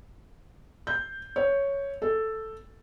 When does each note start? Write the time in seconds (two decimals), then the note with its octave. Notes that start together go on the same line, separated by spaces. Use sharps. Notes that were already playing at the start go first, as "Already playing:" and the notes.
0.87 G6
1.36 C#5
2.02 A4